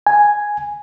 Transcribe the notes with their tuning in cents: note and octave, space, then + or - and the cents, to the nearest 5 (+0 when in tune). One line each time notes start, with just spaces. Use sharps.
G#5 +0